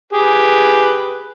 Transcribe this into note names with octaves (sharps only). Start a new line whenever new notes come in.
G4 G#4 B4